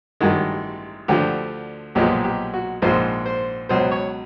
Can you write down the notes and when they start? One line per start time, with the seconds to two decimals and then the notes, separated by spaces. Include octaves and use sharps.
0.21 A1 G2 D#3 G#3 F#4
1.08 D2 D3 F3 G4
1.95 B1 A#2 F3 G#3 G4
2.24 G4
2.54 F#4
2.82 A#1 G#2 F3 G#3 C5
3.26 C5
3.69 C#2 B2 F#3 C5
3.91 C#5